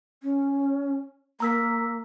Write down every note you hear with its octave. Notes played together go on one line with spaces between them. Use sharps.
C#4
A#3 A#5 E6 B6